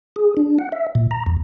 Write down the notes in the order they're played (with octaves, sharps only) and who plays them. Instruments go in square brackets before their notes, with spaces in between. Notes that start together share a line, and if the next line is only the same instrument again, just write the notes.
[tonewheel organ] G#4
D4
F#5
E5
A#2
A#5
E2